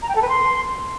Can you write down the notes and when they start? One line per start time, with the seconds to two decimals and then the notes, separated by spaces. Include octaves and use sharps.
0.02 A#5
0.08 G5
0.15 A4
0.22 B4
0.28 C6